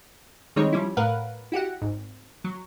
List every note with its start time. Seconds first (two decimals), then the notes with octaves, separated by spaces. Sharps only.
0.56 D#3 G3 G#3 C4 D#4 C#5
0.73 F3 G3 C#4 E4
0.97 A2 A#4 B4 F5 F#5
1.52 E4 F#4 G4 F#5
1.82 G#1
2.44 F#3